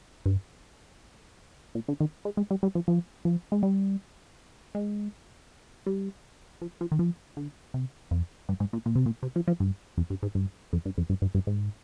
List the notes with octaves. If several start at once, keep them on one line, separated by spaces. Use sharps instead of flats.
G2
A#2
D3
D#3
G#3
G#3
G3
G3
F3
F3
F3
G#3
G3
G#3
G3
F3
F3
D#3
F3
D3
C3
F2
G2
G#2
A#2
A#2
C3
A#2
C3
F3
F3
G2
F2
G2
G#2
G2
F2
G2
F2
G2
G2
G2
G#2